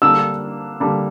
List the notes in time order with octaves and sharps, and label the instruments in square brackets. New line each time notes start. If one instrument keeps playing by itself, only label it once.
[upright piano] D3 G3 A#3 D4 [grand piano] E6
[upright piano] D3 G3 A#3 D4